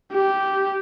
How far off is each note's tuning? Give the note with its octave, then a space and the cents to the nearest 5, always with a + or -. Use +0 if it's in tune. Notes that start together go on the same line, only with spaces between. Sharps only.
G4 -10